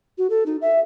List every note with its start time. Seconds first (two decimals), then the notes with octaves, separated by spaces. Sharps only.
0.18 F#4
0.30 A4
0.46 D#4
0.62 E5